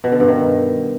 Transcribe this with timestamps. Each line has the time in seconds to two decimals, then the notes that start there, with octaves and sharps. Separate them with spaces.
0.04 B2
0.12 D3
0.20 G2
0.28 D#3